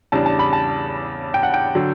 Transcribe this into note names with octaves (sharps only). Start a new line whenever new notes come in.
E2 C#3 G3 D4 A5
A5
B5
A5
G5
F#5
G5
D3 F#3